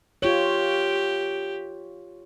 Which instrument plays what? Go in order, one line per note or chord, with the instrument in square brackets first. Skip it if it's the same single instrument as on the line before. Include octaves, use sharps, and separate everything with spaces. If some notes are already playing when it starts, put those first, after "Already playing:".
[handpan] F4 C#5 [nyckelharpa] G4